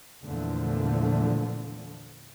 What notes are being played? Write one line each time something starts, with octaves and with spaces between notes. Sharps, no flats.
E2 A#2 D3 F3 A3